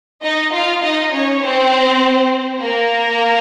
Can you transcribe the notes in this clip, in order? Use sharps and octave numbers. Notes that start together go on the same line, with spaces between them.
D#4 D#5
F4 F5
D#4 D#5
C#4 C#5
C4 C5
A#3 A#4